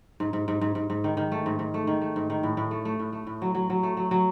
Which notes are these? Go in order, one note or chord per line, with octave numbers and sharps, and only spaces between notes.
G#2
G#2
G#2
G#2
G#2
G#2
D#3
D#3
A3
G#2
G#2
A3
D#3
A3
G#2
D#3
A2
A2
A3
A3
A2
A3
A2
F#3
F#3
F#3
A3
F#3
F#3